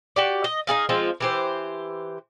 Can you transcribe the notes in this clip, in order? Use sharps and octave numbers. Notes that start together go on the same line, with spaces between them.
F#4 G4 D5
D#5
D#4 F#4 G#4 F5
F3 G#3 C4 F4
E3 G4 C5